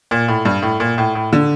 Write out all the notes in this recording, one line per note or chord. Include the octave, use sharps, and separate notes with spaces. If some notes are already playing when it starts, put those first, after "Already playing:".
A#2
A2
G2
A2
A#2
A2
A2
D3